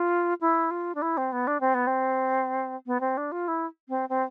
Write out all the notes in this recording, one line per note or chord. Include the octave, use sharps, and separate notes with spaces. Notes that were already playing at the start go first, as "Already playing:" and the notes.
Already playing: F4
E4
F4
D4
E4
C4
B3
D4
C4
B3
C4
B3
C4
D4
F4
E4
C4
C4